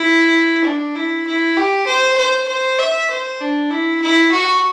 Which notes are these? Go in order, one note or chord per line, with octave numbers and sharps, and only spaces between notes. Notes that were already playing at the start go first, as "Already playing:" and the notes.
Already playing: E4
D4
E4
E4
G4
C5
C5
C5
E5
C5
D4
E4
E4
F#4